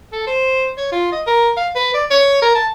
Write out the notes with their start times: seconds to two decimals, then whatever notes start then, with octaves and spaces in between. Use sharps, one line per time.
0.12 A4
0.27 C5
0.77 C#5
0.92 F4
1.12 D#5
1.27 A#4
1.57 F5
1.75 B4
1.94 D5
2.10 C#5
2.42 A#4
2.55 A5